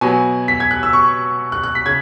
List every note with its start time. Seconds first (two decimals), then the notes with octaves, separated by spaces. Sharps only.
0.01 B2 F#3 B3 G#5
0.48 B6
0.60 G#6
0.71 F#6
0.83 E6
0.93 C#6
1.52 F#6
1.64 F#6
1.75 B6
1.86 C#3 G#6